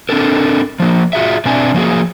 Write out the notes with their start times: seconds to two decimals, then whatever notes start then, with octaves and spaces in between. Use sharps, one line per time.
0.09 C4 D4 A4 A#4
0.80 F3 A#3
1.13 F4 F#4 G#4 E5
1.45 B2 C4 D4 D5 E5 G#5
1.74 F3 A#3 F#4 G#4